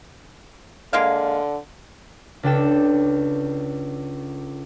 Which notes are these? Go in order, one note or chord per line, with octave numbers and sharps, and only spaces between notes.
D3 G#3 A#3 F5
C#2 D4 A4 G5 E7